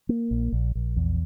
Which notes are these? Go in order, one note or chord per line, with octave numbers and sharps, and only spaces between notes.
A#3
A#1
A#1
A#1
E2